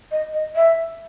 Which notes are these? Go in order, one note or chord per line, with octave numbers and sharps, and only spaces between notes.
D#5
D#5
E5